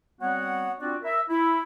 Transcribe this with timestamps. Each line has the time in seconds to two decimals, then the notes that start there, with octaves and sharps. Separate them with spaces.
0.20 G3 B3 C4 F#4 C#5 F#5
0.80 C4 D4 F4 F#4 D5
1.03 A#4 E5
1.29 E4